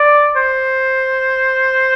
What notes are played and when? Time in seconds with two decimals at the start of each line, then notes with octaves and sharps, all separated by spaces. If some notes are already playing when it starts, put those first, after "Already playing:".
Already playing: D5
0.36 C5